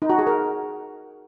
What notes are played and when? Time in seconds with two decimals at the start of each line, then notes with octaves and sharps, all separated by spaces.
0.02 D#4
0.10 F#4
0.19 G#4
0.27 A#4